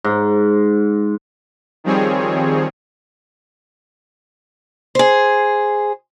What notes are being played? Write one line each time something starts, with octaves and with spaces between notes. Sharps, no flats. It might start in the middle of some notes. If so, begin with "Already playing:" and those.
G#2
D#3 F3 G3 C4 G#4 C#5
G#4 C5